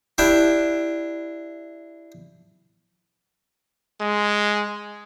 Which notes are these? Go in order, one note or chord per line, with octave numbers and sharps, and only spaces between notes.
D4 E4 G4
G#3